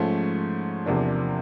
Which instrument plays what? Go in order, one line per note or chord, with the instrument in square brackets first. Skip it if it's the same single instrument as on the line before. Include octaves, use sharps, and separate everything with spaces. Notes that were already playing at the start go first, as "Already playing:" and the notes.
Already playing: [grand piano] G#2 F3 A3 C#4
E2 C3 F3 A#3 D4